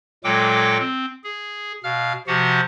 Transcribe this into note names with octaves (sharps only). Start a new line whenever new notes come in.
A#2 F#3 G#3 A4 G5 D6
C4
G#4
B2 F5 F6
C3 F3 F#4 G4 F#5